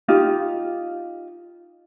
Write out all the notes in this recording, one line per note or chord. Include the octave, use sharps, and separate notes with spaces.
D#4 F4 G4